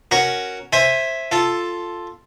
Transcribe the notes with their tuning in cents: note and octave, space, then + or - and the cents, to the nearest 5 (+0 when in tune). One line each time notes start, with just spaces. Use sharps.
C#4 +0 F#4 +0 A#4 +0
C5 +20 E5 +0 G#5 +0
F4 +0 A4 +0